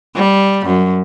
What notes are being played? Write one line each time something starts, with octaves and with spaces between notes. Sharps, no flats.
G3
F#2